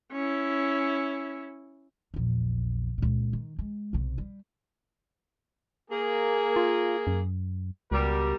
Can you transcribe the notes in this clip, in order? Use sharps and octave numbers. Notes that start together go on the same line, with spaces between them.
C#4 E4
A#1 E2
C#2 A#2
D#3
G#3
B1 C3
G3
A#3 G#4
F4
F#2
C#2 B2 G3 A#4